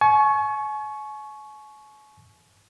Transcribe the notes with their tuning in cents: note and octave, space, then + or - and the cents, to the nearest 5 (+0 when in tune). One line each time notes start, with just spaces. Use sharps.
G#5 +40 C#6 +0